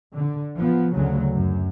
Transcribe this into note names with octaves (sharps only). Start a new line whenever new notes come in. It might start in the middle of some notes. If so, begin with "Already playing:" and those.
D3
F3 B3
D2 C#3 F#3
F#2